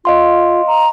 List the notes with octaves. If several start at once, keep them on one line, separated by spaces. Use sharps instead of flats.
F4 D#5 F5 C6
A#5